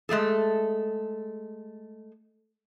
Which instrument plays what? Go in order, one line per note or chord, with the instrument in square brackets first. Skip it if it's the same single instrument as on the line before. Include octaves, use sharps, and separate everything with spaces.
[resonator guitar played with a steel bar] G#3 A3 G#4 A4